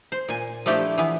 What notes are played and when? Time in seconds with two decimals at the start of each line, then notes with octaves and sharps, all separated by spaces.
0.12 C5
0.28 A#2 G#5
0.66 F3 A3 D4 E4 G4
0.98 E3 B3